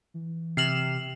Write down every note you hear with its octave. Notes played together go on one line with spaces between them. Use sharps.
E3
C3 F6 C7 E7 F#7